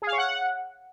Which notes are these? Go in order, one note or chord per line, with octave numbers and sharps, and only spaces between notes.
G#4
F5
C#5
F#5